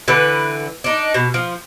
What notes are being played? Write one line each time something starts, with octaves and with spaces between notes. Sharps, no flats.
D3 E3 B4
D4 D#4
B2
F3